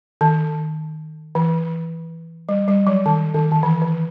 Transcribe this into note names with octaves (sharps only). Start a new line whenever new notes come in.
D#3
E3
G3
G3
F#3
D#3
D#3
D#3
E3
E3